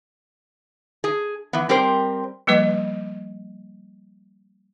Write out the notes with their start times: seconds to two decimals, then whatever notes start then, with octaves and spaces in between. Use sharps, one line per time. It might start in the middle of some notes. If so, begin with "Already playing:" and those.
1.04 G#4
1.53 E3 B3
1.69 G3 C4 G4 A#4 C5
2.47 F3 G3 A#3 B4 D#5